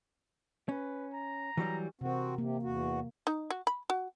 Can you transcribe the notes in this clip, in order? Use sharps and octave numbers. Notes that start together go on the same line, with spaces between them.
C#4 B4
A#5
E3 F#3 G3
C3 E3 C4 F#4 A#4
C3 A#3
E2 F#4
D#4
F#4
B5
F#4